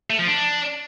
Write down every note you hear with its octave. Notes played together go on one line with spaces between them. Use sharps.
A3
F3
D4